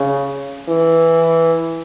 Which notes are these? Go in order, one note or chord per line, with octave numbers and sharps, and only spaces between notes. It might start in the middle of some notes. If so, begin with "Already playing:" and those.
Already playing: C#3
E3